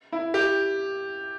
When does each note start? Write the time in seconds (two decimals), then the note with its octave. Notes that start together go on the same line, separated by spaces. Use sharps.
0.12 E4
0.34 G4